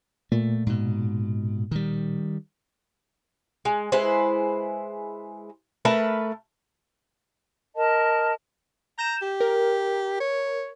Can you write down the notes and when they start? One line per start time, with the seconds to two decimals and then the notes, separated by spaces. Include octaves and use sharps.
0.32 A#2 A3
0.67 G#2 B2
1.71 D#3 G3
3.65 G#3
3.92 G#3 E4 B4 C5
5.85 A3 A#4 B4 A5
7.75 A#4 D#5 A5
8.99 A#5 G6 E7
9.22 G4
9.41 A#4
10.20 C#5